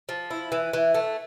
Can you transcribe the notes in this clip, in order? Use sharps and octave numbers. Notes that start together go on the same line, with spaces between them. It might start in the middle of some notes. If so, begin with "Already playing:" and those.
F3
E4
E3
E3
A3